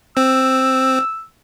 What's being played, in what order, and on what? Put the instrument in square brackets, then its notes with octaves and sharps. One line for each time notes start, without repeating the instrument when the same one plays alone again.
[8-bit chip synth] C4 [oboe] E6